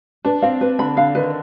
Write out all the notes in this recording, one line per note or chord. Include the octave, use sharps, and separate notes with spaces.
D4 B4
C4 F5
C4 B4
D3 B5
D3 F5
D#3 B4